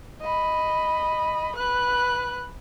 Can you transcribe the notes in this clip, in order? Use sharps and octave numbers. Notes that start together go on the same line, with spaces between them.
D#5 B5
B4 F#6